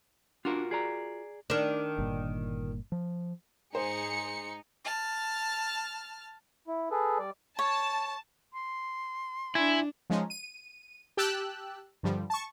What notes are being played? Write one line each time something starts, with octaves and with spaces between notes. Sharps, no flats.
D4 F4 F#4 A#4
G#4 D5 A#5
D#3 D4
G1 A#2
F3
G#2 D#4 G#4 C5 C#7
A5 F6
E4
G#4 A4 B4
G3 D5
C#5 A5
C6
D4 E4 G#5
F3 G#3 C#4 D#4
D#7
G4 G5 A5 E6 F#6
G2 D3 F3 G3
A5 C#6